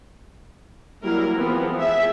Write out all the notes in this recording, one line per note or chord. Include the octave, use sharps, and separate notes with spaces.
F#3 G3 A#3 E4 A#4
E3 F3 G#3 B3 C4
G#4 E5